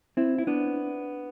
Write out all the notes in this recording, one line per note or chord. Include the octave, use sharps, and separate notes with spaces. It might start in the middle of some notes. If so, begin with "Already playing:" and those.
C4 E4
E4
B3 D4